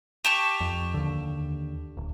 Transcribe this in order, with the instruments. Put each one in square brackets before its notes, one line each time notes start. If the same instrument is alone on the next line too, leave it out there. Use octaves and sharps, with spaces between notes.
[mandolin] G4 A5 C#6
[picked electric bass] F2
D#2 D3
D1